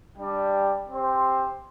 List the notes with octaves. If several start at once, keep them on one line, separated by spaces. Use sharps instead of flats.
G3 D4 G4 D5
C4 G4 C5